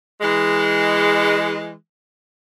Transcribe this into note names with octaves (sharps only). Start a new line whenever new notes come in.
E3 G#3